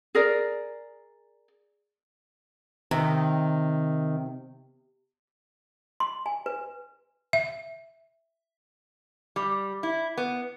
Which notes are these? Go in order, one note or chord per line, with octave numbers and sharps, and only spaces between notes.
G#4 A#4 D5
C3 D#3
C6
G#5
B4
E5
G3
E4
B3